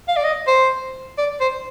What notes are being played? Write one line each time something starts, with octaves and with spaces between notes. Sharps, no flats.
F5
D5
D#5
C5
D5
C5